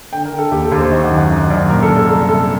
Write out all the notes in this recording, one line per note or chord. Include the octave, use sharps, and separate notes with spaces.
D3 G5
A#4
D3
A4
D#2 G4
A4
D#2
C5
D#3 D#5
F#5
F#2
F#5
F#2 D#5
F#2 D5
A#2 A#4
A4
A#2
A4
C2 A4
C2 A4